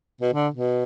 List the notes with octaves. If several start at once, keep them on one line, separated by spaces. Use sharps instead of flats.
B2
D3
B2